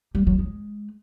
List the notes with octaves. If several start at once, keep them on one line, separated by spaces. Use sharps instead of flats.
G3
F#3
G#3